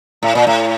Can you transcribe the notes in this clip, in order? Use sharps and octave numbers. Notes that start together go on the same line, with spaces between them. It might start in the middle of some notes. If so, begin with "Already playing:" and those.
A2
A#2
A2